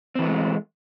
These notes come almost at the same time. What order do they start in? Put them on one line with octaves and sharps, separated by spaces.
C4 E3 A3 G#3